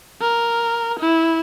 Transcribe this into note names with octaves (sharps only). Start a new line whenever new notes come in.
A#4
E4